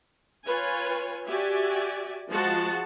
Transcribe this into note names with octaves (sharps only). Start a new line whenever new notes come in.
F4 B4 C#5 G#5
F#4 G4 D5 E5 G#5
F3 G#3 F4 F#4 F#5 A5